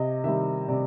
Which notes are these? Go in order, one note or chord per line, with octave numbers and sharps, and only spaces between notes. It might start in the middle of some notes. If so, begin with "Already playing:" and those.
Already playing: C3 D#5
D#3 G3 E5
C3 D5